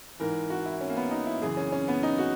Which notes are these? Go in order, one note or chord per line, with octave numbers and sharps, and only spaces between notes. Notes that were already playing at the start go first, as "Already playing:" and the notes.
G#2 E3 A#4
F#4
E4
C#4
A#3
B3
D#4
E4
F#2 C#3 E3 G#4
C#4
C#4
B3
D#4
F#4